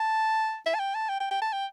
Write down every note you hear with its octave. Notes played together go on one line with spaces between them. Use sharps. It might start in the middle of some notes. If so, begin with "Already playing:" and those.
Already playing: A5
E5
A5
G5
A5
G5
G5
G5
A5
G5